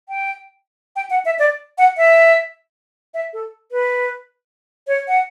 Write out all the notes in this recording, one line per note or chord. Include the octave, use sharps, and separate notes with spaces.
G5
G5
F#5
E5
D5
F#5
E5
E5
A4
B4
C#5
F#5